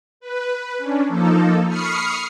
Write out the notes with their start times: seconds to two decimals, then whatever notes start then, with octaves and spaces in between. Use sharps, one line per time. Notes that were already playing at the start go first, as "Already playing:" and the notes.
0.20 B4
0.78 C#4 D4
1.08 F3 A#3 D#4 A4
1.67 B5 C#6 D#6 F6 C7 C#7